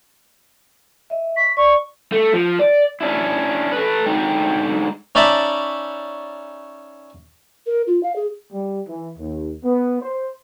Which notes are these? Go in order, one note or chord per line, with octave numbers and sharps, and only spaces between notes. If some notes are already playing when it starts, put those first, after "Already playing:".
D#5 E5
C#6 B6
D5 C#6
A3
F3
D5
C#4 D4 E4
A4 B4
D3 G#3 C4 D#4 G5
C#4 D#4 D5 E5 A5 B5
A#4
F4
F5
G#4
G3
E3
D#2
B3
C5